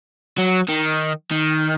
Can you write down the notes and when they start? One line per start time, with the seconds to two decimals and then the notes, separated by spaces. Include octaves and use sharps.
0.38 F#3
0.69 D#3
1.31 D#3